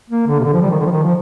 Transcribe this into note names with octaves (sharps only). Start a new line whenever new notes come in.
A#3
D3
C3
D3
F3
G3
D#3
D3
F3
D#3
F3